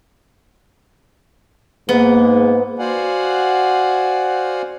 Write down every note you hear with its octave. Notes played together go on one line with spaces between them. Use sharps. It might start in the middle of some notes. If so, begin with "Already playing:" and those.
G#2 A#3 B3
F#4 C5 D5 F5 F#5 G#5